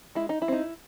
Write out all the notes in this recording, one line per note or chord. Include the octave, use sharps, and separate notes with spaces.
G#3 E4
D#4
E4
C4 D#4